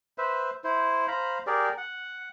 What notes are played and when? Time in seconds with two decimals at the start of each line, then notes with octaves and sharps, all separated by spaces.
0.18 B4 C5 E5
0.64 E4 C5
1.08 C5 F5 A#5 B5
1.47 G4 G#4 A#4 D5
1.78 F#5